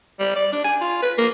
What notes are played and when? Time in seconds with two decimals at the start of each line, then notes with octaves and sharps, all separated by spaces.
0.19 G3
0.36 D5
0.52 D4
0.64 G#5
0.81 F4
1.02 B4
1.18 A#3